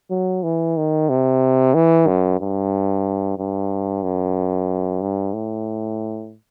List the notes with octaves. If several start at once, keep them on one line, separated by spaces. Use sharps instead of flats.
F#3
E3
D#3
C3
E3
F#2
G2
G2
F#2
G2
A2